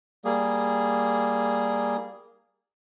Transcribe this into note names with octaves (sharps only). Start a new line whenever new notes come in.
G3 A#3 G#4